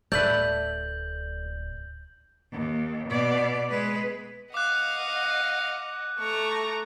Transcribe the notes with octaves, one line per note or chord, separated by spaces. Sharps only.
D1 A3 B4 D5 G6 F#7
D#2
B2 D5
G#3 B4
D#5 F5 F#5 D6 F#6
A3 A#5 C#6